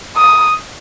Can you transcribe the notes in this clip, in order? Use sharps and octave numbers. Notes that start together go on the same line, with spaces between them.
D#6